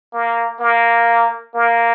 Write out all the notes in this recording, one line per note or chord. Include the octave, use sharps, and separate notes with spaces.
A#3
A#3
A#3